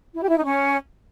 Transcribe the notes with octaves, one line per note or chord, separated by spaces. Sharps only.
E4
G4
E4
D#4
C#4